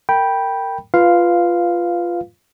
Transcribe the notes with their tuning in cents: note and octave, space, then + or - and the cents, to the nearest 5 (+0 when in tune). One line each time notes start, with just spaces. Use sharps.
A#4 -25 G5 +0 B5 -15
F4 -10 B4 +0 F5 +0